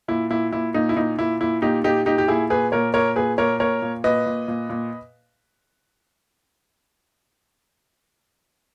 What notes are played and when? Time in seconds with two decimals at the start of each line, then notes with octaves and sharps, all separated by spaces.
0.08 A#2 E4
0.31 A#2 E4
0.52 A#2 E4
0.74 A#2 D#4
0.89 E4
0.96 A#2 D#4
1.18 A#2 E4
1.40 A#2 E4
1.62 A#2 D#4 G4
1.84 A#2 D#4 G4
2.06 A#2 D#4 G4
2.18 G4
2.28 A#2 E4 G#4
2.50 A#2 G#4 B4
2.72 A#2 A#4 C#5
2.94 A#2 A#4 C#5
3.16 A#2 G#4 B4
3.38 A#2 A#4 C#5
3.60 A#2 A#4 C#5
3.82 A#2
4.04 A#2 B4 D#5
4.26 A#2
4.48 A#2
4.70 A#2